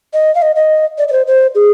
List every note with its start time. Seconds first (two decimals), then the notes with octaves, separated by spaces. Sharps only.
0.13 D#5
0.35 F5
0.42 D#5
0.56 D#5
0.98 D5
1.08 D5
1.12 C5
1.27 C5
1.55 G#4